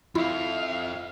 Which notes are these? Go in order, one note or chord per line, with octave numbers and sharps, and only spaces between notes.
F2 E4 F4 E5 F5